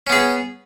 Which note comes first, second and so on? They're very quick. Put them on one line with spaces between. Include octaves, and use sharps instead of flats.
C#4 B3 G#4